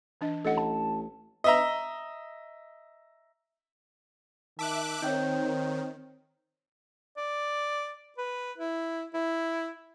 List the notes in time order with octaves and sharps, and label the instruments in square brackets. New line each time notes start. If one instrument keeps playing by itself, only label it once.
[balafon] E3 D4 D#5
[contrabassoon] A1 [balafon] A4 D#5 F#5
[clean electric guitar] A5
[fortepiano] D#5 E5 A#5
[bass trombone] D#3 [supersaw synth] E5 D6 F#6 [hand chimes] A5
[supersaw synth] D#3 [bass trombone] C4 [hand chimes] C#5 G5 G6
[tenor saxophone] D5
B4
E4
E4